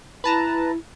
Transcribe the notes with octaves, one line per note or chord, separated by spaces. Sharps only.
E4 B4 A5 A#5